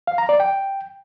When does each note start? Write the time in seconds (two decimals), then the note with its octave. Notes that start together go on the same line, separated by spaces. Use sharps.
0.07 F5
0.18 A#5
0.29 D5
0.40 G5